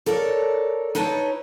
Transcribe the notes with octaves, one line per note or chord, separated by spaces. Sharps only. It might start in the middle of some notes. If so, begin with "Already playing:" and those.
A4 A#4 C#5 D5
D#4 E4 B4 C#5 A5